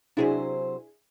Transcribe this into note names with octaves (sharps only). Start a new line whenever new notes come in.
C3 F#3 D4 E4 G#4 C5